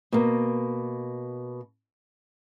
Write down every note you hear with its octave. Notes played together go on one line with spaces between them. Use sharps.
B2 A#3